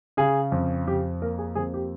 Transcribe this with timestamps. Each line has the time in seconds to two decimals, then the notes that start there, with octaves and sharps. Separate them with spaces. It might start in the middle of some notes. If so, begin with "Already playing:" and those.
0.17 C#3 G#4
0.52 F2
0.86 F2 G4
1.22 A#3 A#4
1.38 G#4
1.55 F2 G#4
1.74 G4